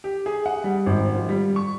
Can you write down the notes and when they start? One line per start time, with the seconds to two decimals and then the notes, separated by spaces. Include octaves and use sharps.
0.04 G4
0.26 G#4
0.46 F#5
0.64 G3
0.86 G#1
1.15 F3
1.29 G3
1.56 C#6